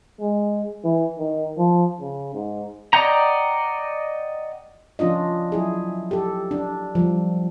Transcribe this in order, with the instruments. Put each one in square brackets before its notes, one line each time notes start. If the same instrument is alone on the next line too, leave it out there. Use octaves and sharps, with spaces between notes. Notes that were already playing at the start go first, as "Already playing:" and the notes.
[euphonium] G#3
E3
D#3
F3
C#3
G#2
[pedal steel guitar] D5 D#5 F#5 G5 A#5
[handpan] F3 C#4 D4 F4 D#5
F#3 E4 G#4
G4 A4
D4
F3 G3